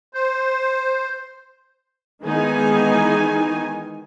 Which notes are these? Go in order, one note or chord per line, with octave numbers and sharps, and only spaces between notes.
C5
D#3 E3 G#3 B3 D#4 G#5